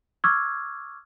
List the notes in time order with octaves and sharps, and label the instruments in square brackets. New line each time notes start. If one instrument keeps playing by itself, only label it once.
[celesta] C#6 D6 E6 F6 G#6